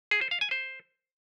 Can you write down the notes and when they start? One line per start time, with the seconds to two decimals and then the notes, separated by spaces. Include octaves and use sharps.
0.11 G#4
0.21 C5
0.31 F5
0.41 G#5
0.51 C5